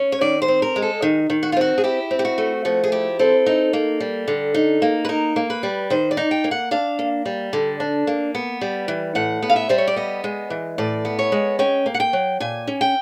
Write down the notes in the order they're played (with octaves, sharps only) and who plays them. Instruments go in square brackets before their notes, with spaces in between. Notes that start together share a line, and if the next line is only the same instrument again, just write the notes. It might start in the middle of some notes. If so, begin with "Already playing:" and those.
Already playing: [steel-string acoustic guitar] C#4
C#5
D#3 D5
C5
C4
A#4
G#3
A4
D#3
D#3
F#4
F4
C4 F#4
G#4
E4 G4
C4
G4
F#4
A3
F3 F#4
G#4
E4 G4
C4 A4
D#4
A#3
G3
D3
D#4
A#3
B4
D#4 A#4
A#3
B4
G3
D#3 C5
D5
D#4
G5
A#3
F#5
D4 F5
A#3
G3
D3
D4
A#3
B3
G3
E3
A2 F#5
B3
F5
E5
G3 C5
C#5
D5
B3 D#5
G#3
E3
A2 D5
B3
C#5
G#3
C#4 G5
A#3
F#5
G5
F#3
A#2 G#5
C#4
G5